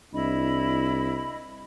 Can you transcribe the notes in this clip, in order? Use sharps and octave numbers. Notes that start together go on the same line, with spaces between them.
C2 D4 E4 D#5 B5